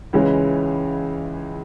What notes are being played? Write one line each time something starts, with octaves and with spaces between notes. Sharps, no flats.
C#2 C#3 E3 G#3 C#4